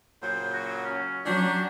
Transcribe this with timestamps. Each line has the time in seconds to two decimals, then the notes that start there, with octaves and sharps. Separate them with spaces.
0.22 A#2 C#3 F#3 C5
0.53 F#4
0.84 C#4
1.26 F#3 C#4 D4 G4